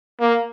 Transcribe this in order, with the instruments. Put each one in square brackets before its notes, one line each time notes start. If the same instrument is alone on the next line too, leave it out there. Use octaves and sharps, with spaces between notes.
[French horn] A#3